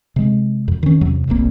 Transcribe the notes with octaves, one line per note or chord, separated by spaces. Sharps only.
C3 G#3
F2
D#3 C#4
E2 C3 F#3
D1 G1 C2 A#3